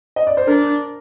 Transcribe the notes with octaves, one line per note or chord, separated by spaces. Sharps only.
D#5
D5
C5
D4 A#4